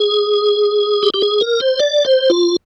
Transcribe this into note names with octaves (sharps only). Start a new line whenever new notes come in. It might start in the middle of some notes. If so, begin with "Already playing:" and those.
Already playing: G#4
G4
G4
G#4
A#4
C5
D5
C5
F4